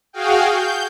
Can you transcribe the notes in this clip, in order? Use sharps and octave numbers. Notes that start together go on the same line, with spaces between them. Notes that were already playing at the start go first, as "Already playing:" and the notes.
F#4 G#4 F5 G5
G6